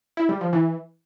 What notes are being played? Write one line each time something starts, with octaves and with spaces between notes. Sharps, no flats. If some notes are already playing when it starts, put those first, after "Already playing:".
E4
G3
F3
E3